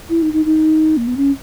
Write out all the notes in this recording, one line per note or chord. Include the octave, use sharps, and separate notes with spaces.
E4
D#4
D#4
D#4
A#3
B3
C#4